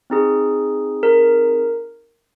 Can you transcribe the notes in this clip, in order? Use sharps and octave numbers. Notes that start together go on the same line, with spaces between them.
C4 D#4 G#4
A#4